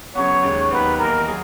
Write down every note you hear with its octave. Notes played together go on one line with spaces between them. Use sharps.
C#3 F#3 B3 C#5
D#2 C#3 G#3
D#2 D#3 F#3 B3 B4
E2 D#3 A#3 A#4
F#3 G#4